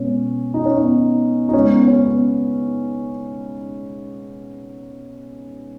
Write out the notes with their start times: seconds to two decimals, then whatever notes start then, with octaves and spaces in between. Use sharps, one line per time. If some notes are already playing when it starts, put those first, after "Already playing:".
Already playing: B2 G#3 B3 C#4
0.54 D#4
0.66 C#4
0.78 B3 D#4
1.49 D#4
1.53 C#3 G#3 B3 C#4
1.70 B3
1.88 C#4
2.04 B3